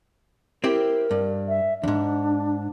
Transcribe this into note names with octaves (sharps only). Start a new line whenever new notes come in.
C4 E4 G4 A#4
G2
E5
E2 G#2 D4